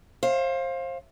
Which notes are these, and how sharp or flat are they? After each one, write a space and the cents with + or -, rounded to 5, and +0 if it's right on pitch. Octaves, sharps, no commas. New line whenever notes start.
C5 +30 F5 +0